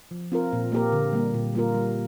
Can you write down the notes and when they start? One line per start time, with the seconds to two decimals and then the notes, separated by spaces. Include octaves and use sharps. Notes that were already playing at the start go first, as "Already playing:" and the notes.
0.11 F3
0.32 C4 F4 A#4
0.53 A#2
0.72 A#3 G4 A#4
0.92 D3
1.13 G3 A#3
1.34 A#2
1.55 G3 A#3 F4 A#4
1.75 G3